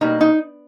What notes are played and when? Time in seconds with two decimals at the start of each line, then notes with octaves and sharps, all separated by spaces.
0.01 B2 G3 A#3 D#4
0.21 D#4